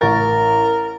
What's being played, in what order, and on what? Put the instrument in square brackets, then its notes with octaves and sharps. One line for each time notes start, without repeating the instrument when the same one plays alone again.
[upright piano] A1 C#6 A6 [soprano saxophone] A#4